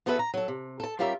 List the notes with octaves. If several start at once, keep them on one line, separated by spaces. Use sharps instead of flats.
E2 B3 F#4 A4 B4 E5
A#5
F#3 A4
C3
A4 A5
G3 C#4 F4 G4 A#4 E5